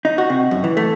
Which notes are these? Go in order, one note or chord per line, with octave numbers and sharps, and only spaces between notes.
D#4
F#4
C3
F#2
E3
A3